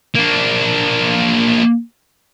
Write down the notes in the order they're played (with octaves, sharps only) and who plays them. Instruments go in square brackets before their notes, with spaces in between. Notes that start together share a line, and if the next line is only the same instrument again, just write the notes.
[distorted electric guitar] A#3 D4